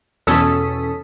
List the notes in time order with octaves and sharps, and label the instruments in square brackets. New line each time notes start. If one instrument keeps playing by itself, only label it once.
[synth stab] E2 B2 C#4 A4 D#6 B6